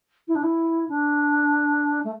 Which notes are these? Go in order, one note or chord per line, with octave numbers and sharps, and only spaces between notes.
E4
D4
E4
D4
A3